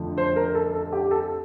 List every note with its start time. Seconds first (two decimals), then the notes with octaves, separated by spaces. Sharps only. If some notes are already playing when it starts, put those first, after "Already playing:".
Already playing: F2 D3 F3 A3
0.18 C5
0.36 A#4
0.55 A4
0.74 A4
0.92 G4
1.11 A4